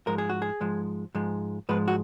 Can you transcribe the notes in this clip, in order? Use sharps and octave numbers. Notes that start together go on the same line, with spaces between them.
G#2 F3 G#3 A#4
G#4
F#4
G#4
G#2 F3 G#3
G#2 F3 G#3
G#2 F3 G#3 B4
F#4